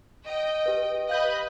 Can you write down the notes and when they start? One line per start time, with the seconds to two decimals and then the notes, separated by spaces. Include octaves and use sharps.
0.25 D#5 G5
0.66 G4 B4
1.09 B4 D#5 F5 F#6 G6 G7